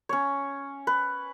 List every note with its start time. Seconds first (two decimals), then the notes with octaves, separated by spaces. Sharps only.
0.09 C#4 C#5
0.87 B4